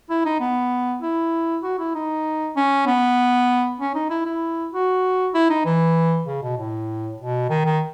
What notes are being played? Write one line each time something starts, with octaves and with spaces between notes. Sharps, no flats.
E4
D#4
B3
E4
F#4
E4
D#4
C#4
B3
C#4
D#4
E4
E4
F#4
E4
D#4
E3
C#3
B2
A2
B2
D#3
D#3